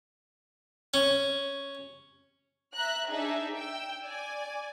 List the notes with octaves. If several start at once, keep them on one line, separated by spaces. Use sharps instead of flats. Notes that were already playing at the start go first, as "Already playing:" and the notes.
C#4
E5 A#5 F#6
D4 D#4 G#4 E5
G5 E6
D5 G#5